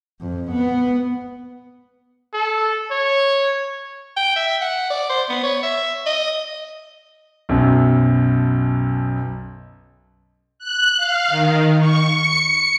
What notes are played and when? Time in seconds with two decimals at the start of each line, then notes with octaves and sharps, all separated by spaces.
0.21 F2
0.51 B3
2.33 A4
2.91 C#5
4.16 G5
4.36 E5
4.61 F#5
4.90 D5
5.09 C5
5.29 B3
5.43 C#5
5.63 E5
6.06 D#5
7.49 B1 F#2 B2
10.59 F#6
10.97 F5
11.28 D#3
11.80 C#6
12.17 C#7